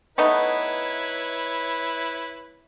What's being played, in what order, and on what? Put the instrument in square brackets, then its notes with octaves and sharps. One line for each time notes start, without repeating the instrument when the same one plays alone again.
[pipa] A3 B3 D#4 [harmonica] E4 B4 C#5